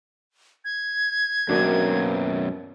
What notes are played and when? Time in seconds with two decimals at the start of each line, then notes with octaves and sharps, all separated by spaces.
0.65 G#6
1.49 F#2 B2 F#3 A#3 C4 D4